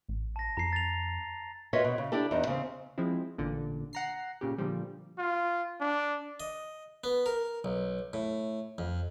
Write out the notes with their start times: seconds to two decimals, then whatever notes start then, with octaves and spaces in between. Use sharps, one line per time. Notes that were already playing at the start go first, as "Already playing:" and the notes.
0.09 A1
0.36 A5 A#6
0.57 F2 A#5 C7
0.73 A6 F7
1.73 F4 F#4 B4 C#5 D#5 E5
1.84 B2
1.98 C#3
2.12 D4 E4 G4 A4
2.31 E2 D#4
2.47 C#3 C4
2.98 F3 G#3 C4 E4
3.38 A1 A#2 D3
3.93 F#5 A#5 C7
4.41 A#2 C#3 G4
4.58 A#2 D3 F3 G3
5.18 F4
5.80 D4
6.40 D#5
7.04 B3
7.26 A#4
7.64 B1
8.13 A2
8.78 F2